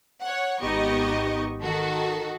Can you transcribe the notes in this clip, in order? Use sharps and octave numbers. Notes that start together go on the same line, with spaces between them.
C#5 F#5
G#1 B3 D#4 G4 D#5 C#6
D#3 F#4 A4